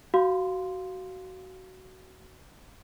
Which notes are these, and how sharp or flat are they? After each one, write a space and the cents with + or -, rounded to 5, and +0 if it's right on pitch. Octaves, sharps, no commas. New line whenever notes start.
F#4 +15 F5 +0 C6 -10